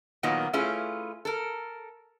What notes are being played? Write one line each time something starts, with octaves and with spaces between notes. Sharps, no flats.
A#2 D#3 F#3 A#3 B3
A3 C#4 E4 F4 G#4 B4
A4 A#4